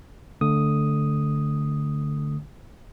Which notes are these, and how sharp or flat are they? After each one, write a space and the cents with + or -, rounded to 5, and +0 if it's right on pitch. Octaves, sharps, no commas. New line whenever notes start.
D3 +0 A3 +0 D#6 +0